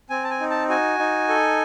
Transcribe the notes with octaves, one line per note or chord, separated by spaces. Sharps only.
C4 G#5
A5
G#5
D#4
A5
F#4 G#5
D#4
A4